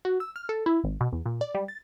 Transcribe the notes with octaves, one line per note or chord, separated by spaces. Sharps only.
F#4
E6
F6
A4
E4
G#1
B2
E2
A#2
D5
G3
A6